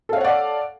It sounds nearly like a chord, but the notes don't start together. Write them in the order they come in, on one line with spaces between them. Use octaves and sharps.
A4 F5 C#5 F#5 D5